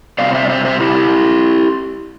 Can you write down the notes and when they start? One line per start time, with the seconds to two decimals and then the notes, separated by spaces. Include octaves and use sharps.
0.18 C3 G3 C4 D5 F5
0.34 C5 E5
0.45 D5
0.49 C5 E5
0.65 C5 E5
0.80 E4 G4